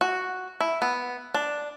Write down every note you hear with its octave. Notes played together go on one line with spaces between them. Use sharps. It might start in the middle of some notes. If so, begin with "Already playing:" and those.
F#4
E4
B3
D4